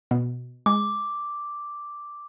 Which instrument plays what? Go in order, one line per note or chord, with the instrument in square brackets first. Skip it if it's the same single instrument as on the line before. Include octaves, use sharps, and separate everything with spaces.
[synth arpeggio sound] B2
[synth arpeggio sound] G#3 [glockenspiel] D6